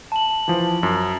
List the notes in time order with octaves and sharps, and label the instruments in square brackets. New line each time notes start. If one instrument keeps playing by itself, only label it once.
[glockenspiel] A5 F#7
[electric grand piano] E3 F3
F#2